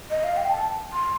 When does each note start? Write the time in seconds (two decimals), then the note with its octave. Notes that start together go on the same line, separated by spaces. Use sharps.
0.11 D#5
0.24 F5
0.37 G5
0.50 A5
0.93 C6